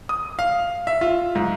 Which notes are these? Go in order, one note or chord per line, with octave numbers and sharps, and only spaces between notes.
D#6
F5
E5
F4
G#2